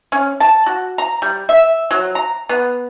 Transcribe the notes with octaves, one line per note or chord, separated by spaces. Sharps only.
C#4
A5
F#4
A#5
G3
E5
F#3
A#5
B3